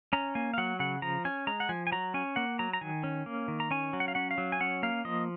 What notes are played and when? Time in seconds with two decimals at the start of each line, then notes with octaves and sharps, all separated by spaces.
0.13 C#4 A#5
0.35 A#3 G#5
0.54 F5
0.58 F#3 F#5
0.79 C#3 F#5
1.02 F3 A#5
1.25 C#4 G#5
1.47 G#3 A#5
1.60 F#5
1.69 F3 G#5
1.87 G#5
1.92 F#3 A#5
2.14 C#4 G#5
2.36 A#3 F#5
2.59 F#3 A#5
2.73 A#5
2.81 D#3 G#5
3.04 C#4
3.26 A#3
3.48 D#3
3.60 A#5
3.71 C#4 G#5
3.93 F#3
4.00 F#5
4.08 F5
4.15 C#4 F#5
4.31 F5
4.38 F#3
4.52 G#5
4.60 C#4 F#5
4.83 A#3 F5
5.05 F3 D#5